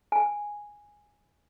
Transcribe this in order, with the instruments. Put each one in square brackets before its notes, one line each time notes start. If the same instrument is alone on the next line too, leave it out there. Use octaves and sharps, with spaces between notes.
[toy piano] G#5